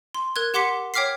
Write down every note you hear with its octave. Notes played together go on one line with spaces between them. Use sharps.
C6
A#4 F#6 G#6
G4 F#5 C6 D6 B6 C#7
C#5 G5 D6 F6 B6 C7